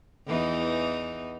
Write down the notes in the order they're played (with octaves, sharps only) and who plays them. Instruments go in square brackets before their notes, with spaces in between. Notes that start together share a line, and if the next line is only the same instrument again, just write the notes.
[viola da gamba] E2 E3 D#4